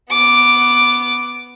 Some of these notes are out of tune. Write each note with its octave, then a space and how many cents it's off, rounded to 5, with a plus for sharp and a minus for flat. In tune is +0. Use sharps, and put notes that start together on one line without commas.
B3 +0 D6 +0